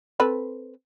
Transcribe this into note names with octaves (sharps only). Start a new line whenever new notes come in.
C4 A4 B4